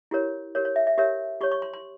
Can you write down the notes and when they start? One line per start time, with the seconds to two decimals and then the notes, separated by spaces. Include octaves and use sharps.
0.11 E4 G4 A#4 C#5
0.55 G4 A#4 C#5
0.65 C#5
0.76 E5
0.87 E5
0.98 G4 A#4 C#5 E5
1.41 G4 C#5 C#6
1.52 C#6
1.62 C6
1.74 C6